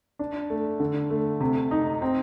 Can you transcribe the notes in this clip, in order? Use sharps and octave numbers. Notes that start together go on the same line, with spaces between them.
D4
A3
D3
A3
C3
D#4
C4